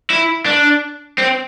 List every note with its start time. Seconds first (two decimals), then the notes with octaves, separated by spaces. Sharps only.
0.10 E4
0.45 D4
1.18 C4